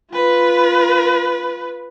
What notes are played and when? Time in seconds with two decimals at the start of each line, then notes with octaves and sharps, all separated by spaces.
0.12 F4 B4